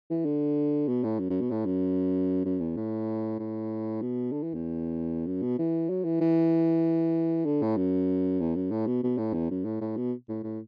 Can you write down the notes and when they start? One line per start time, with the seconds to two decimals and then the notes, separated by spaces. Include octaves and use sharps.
0.10 E3
0.25 D3
0.88 B2
1.04 A2
1.19 F#2
1.30 F#2
1.41 B2
1.51 A2
1.66 F#2
2.45 F#2
2.60 E2
2.76 A2
3.39 A2
4.01 B2
4.32 D3
4.43 E3
4.54 E2
5.26 F#2
5.42 B2
5.58 E3
5.89 F#3
6.04 E3
6.20 E3
7.45 D3
7.62 A2
7.77 F#2
8.40 E2
8.55 F#2
8.71 A2
8.87 B2
9.03 B2
9.18 A2
9.33 E2
9.50 F#2
9.65 A2
9.81 A2
9.96 B2
10.28 A2
10.43 A2